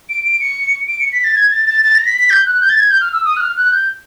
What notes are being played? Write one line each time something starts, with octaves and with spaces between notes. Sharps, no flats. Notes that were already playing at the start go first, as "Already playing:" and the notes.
D7
D7
C#7
D7
C#7
B6
A6
G#6
A6
A6
A6
A#6
B6
B6
G6
F#6
G6
A6
G#6
G6
F6
E6
D#6
F#6
F6
F#6
G6